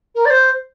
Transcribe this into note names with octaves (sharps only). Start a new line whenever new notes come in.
A#4
D5
C5